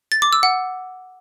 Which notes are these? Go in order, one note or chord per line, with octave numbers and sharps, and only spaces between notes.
A6
D6
E6
F#5